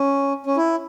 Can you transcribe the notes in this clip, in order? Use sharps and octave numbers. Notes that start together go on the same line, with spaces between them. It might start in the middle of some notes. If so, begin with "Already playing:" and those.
Already playing: C#4
C#4
E4